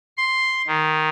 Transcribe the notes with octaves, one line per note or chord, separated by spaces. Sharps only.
C6
D#3